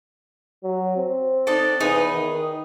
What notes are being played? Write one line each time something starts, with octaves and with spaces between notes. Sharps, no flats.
F#3
C4
D4 D#4 A4
E2 D#4 G#4 B4
D#3